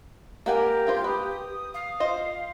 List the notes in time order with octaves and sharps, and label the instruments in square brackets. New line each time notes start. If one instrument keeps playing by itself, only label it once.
[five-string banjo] A#3 F#5 G#5 [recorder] G4 [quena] A#4
[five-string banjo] A#3 F4 C5
[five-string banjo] B4 [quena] D#6
[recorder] F5
[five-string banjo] F4 C5 D#5